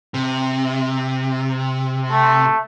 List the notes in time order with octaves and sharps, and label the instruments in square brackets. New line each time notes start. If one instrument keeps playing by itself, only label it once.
[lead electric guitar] C3
[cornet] A3